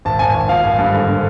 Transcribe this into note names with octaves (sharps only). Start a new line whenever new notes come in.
G#1 A5
G#1 G#5
G#1
F3 F5
G#1
G2
D3
D3